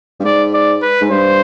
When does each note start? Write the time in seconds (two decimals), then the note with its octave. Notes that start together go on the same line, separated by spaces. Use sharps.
0.20 G2
0.24 G#2 D5
0.53 D5
0.82 B4
1.01 G#2
1.10 G2 C5